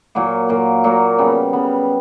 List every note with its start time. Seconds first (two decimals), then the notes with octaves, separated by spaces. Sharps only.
0.15 A#2 F#3 A#3
0.49 A#2 F#3 A#3
0.84 A#2 F#3 A#3
1.19 C#3 G3 B3
1.53 C#3 G3 B3